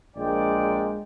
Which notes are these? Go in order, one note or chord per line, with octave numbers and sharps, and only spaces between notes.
A#1 G#3 F4 A#4 D5 G5